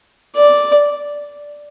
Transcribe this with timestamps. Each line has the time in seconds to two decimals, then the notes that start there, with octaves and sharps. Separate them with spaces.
0.36 D5